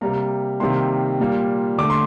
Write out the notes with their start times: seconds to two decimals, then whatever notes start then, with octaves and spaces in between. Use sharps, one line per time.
0.01 C3 G3 A#3 A#5
0.60 C3 D#3 G3 A#3 C6
1.20 A#2 G3 A#3
1.78 D3 A3 D6
1.90 C6